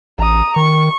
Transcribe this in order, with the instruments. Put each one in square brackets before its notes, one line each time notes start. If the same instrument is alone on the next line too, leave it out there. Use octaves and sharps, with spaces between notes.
[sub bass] A1 [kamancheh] A#5 D#6
[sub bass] D#3 [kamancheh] C#6